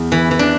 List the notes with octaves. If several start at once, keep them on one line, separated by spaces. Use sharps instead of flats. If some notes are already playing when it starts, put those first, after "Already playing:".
Already playing: E2
E3
E3
D4